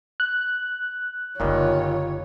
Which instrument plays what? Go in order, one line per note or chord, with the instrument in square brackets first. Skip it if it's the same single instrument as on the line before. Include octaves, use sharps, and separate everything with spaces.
[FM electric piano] F#6
[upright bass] F#1 D3 [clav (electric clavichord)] A#2 D#3 G3 [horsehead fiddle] F4 C#5